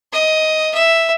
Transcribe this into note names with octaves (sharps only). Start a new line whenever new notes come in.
D#5
E5